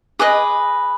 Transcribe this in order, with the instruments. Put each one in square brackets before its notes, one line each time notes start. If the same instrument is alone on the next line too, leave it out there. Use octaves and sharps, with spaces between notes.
[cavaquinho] G#4 B4 D#5 D6